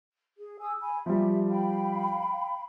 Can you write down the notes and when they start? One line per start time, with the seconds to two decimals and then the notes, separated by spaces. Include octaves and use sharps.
0.38 G#4
0.61 G#5 D#6 E6
0.80 G#5 B5
1.06 F3 G3 G4 E5
1.48 F5 G5 B5